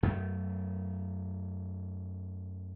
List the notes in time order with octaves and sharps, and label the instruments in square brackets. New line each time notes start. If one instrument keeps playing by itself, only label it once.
[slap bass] F#2 A3